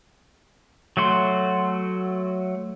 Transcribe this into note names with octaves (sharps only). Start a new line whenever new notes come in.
F#3 A3 F#4 C6